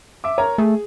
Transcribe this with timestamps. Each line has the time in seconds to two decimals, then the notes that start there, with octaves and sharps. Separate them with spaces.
0.24 E5 D6
0.38 A#4 C#5 A#5
0.58 A3 G#4